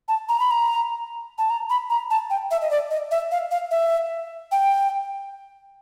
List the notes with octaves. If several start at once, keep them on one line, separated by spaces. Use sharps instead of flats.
A5
A#5
B5
A#5
A5
A#5
B5
A#5
A5
G5
E5
D#5
D5
D#5
E5
F5
F5
E5
G5